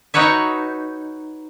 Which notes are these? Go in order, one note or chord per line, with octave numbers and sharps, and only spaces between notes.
D#4 F#4 B4 C#5 E5